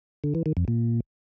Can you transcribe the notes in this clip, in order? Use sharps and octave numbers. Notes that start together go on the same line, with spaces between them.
D3
E3
D#3
F2
A#2